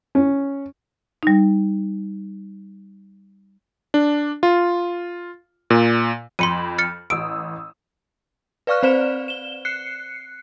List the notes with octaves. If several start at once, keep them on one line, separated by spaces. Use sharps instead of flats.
C#4
G3 D#4
D4
F4
A#2
F2 B5 C6 C#7 D#7 F#7
F6 A6 C#7
A1 D#6 E6 D7
B4 D5 F5 C#6 F6 F#6
C4 C5 D5 E7
E7 G7
F#6 C7 C#7